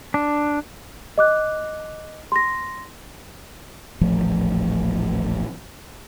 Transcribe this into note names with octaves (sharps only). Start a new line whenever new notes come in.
D4
D#5 D6 F#6
C6 A#6
D#1 A1 F3 A3